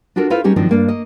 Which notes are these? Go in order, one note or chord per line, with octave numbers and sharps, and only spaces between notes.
D4 F4 F#4 A4 A#4
E4 F4 A4 B4 C5 F5
G3 C#4 D#4 G4 G#4
G#2 D#3 F3 F#3 C4 D4
G2 A#3 D4
A#3 D#5